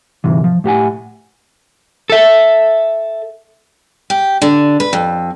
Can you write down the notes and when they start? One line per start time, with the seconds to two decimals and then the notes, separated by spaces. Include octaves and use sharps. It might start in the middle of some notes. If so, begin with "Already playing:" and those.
0.24 D2 G#2 C3 E3
0.44 F3
0.64 A2 G4 F#5 G#5
2.10 A4 E5
4.10 G4
4.42 D3
4.80 B4
4.93 F2